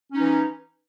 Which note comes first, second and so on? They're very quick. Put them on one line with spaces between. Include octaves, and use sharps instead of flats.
C#4 D#4 E3